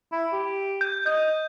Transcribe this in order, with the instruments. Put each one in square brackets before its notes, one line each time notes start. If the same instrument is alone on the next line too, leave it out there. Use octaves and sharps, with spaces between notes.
[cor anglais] E4
G4
[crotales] G6
[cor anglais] D#5 [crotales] G6